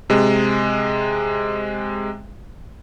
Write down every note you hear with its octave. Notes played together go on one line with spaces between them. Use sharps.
C3 G#3